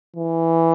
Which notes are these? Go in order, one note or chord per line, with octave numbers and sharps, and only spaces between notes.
E3